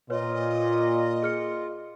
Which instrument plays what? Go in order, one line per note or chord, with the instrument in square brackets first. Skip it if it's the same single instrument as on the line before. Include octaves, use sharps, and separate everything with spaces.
[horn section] A#2 [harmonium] F4 [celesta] B4 C#5 [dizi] D#5
[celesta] G#4 F6 C#7